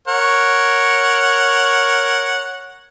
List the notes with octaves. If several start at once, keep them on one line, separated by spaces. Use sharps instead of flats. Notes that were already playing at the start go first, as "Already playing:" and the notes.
A#4 C#5 F#5